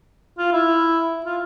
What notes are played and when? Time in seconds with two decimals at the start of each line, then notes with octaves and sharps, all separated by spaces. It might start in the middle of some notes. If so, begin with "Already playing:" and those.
0.38 F4
0.52 E4
1.25 F4